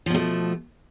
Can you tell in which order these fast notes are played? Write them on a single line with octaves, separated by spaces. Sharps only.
F3 B2 A3